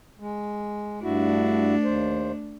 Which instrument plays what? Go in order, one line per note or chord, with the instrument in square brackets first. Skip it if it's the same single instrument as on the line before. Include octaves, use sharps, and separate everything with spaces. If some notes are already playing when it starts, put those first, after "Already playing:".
[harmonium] G#3
[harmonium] G2 E4 F#4 [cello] A3 D4
[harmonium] D#2 C5